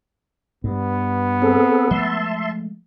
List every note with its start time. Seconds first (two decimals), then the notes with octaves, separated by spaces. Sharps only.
0.64 G2 B3
1.42 C4 G#4 A4
1.91 F3 G#3 A3 E5 A5 C6